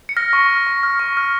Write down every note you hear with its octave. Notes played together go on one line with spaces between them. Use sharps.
C#7
F6 A#6
C#6
F6
C#6
F6
C#6
F6